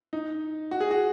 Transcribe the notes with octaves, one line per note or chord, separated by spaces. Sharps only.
D#4
F#4
G#4
F#4